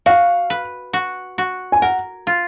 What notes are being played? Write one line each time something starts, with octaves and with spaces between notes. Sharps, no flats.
F#4 F5
B4
F#4
F#4
G#5
A#4 F#5
F4